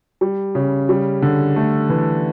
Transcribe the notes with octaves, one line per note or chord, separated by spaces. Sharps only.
G3
C#3
G3
D3
A3
E3